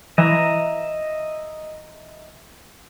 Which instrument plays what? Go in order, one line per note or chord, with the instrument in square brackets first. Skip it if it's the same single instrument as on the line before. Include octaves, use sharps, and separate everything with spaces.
[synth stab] E3 [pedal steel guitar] D#5 E5 A#5